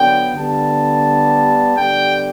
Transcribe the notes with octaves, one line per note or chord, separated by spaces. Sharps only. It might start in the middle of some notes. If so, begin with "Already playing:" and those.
Already playing: D3 F#3 B3 G5
D3 G3 B3 A5
D3 G3 B3 G5